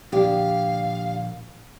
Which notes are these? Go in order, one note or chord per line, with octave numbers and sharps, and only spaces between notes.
A#2 D3 F3 D4 G4 F5